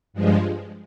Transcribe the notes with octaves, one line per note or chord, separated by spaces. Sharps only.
G2 F3 G#3